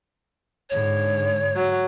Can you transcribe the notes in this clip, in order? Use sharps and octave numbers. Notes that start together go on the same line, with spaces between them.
G#2 D3 C#5
F#3